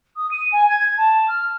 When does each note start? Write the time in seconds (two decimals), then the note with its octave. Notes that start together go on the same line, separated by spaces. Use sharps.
0.16 D#6
0.31 D#7
0.52 G#5
0.69 G#6
0.97 A5
1.28 F6